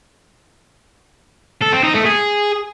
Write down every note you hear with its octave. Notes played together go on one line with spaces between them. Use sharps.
A4
C4
D#4
A3
G#4